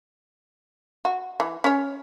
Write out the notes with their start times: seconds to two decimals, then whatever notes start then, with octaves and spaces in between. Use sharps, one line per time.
1.05 F#4
1.40 E3
1.64 C#4 C#5